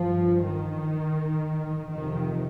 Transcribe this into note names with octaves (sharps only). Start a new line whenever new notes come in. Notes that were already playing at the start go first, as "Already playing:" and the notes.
Already playing: G2 F3
D#3
F2 C3 D#3